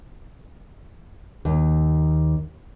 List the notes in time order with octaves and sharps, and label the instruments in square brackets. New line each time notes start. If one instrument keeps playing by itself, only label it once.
[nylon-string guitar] D#2